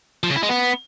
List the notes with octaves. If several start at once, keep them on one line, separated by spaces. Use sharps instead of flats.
F3
C#3
E4
G#3
B3